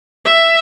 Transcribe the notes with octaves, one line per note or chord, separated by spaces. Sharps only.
E5